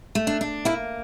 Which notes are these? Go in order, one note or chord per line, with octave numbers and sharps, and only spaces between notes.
A3
D4
D4
A#3 E4